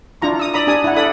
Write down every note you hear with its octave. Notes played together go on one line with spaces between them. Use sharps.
D4 E4 F4 A#5 C#6
D#6 E6
D5 A#5 B5 D#6
D4 G4 G#5 D#6
E4 F#5
A4 D5 B5 D#6